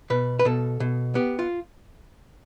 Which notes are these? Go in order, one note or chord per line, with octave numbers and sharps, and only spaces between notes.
B2 B4
B4
B2 A4
B2
B3 G4
F4